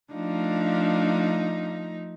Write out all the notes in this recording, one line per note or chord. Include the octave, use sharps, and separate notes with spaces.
F3 A3 D4 D#4 F5